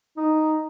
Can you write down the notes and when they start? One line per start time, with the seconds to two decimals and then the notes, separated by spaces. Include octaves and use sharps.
0.17 D#4